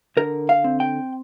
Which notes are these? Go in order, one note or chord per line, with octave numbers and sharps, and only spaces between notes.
D3 A#4
F5
C4
G5